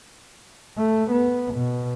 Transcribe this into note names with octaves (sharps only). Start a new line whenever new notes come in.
A3
B3
B2